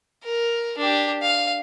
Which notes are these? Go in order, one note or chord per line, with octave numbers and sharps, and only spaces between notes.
A#4
D4 G4
F5